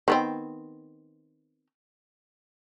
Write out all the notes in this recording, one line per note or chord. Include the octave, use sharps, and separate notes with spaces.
D#3 B3 C4